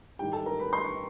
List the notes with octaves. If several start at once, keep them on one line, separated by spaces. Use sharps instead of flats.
G#2 D#3 G3 G4 G5
A4 A5
A#4 A#5
B4 B5
C6
C#6